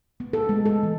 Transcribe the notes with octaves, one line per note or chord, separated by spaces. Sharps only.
B3
A4
G#3
A4
E3